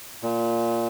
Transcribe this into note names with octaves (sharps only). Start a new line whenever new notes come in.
A#2